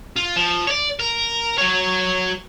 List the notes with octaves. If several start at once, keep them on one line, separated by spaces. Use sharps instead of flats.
F4
F3
C#5 D5
A#4
F#3 C#5